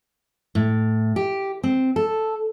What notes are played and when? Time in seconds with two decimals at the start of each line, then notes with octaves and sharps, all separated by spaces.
0.55 A2
1.16 G4
1.63 C4
1.96 A4